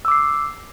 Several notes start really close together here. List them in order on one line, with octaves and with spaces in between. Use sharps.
E6 D6 C7